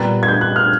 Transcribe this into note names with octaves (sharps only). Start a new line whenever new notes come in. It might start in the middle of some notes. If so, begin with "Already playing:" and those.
Already playing: A#2 G3 B3 F#6
G#6
G6
F#6
F6